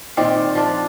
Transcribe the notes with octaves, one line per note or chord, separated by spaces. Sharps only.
A#2 D#3 C4 D5
F3 D4